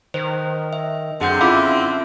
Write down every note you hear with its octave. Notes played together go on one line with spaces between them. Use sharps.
D#3 C5
E5
F#2 D3 C4 G#4 F#5 G6
C#4 E4 F4 E5 F5 B5 D6